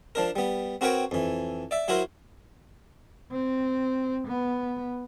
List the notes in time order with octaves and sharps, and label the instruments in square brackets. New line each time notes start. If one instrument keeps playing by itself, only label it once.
[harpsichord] F3 D4 A#4
G3 B3
C4 F#4 A#4 B4 C#5 G5
F2 E3
D5 E5
F#3 E4 F#4 A#4 C5
[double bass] C4
B3